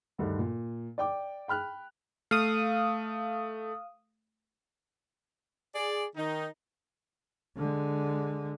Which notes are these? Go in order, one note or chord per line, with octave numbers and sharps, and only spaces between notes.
D2 G2 D3 D#3
A#2
D5 G5 D6
G5 B5 F6 F#6
A3 F5 D#6
G#4 D5
D#3 D#4
D3 G#3